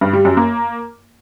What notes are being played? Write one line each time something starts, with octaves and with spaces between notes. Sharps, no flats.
G2
G3
F#2
A#3